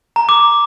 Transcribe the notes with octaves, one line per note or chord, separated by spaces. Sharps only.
A#5
D6